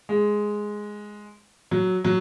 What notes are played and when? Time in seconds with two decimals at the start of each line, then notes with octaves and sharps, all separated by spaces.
0.09 G#3
1.71 F#3
2.05 F#3